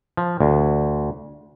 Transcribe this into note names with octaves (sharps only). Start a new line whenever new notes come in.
F3
D2